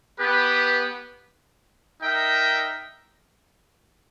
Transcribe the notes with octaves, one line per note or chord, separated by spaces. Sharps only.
B3 G4 B4
D#4 A#4 E5 G5